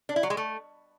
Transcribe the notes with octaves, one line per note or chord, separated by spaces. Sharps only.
D4
E4
F#3
G#3
A3